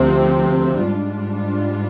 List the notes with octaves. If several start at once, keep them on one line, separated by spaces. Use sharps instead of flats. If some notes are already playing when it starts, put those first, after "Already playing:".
Already playing: D2 C3 F3 C4
G#2 G3 D4 F4